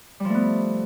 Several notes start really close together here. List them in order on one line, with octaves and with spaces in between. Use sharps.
G3 F3 A3 B3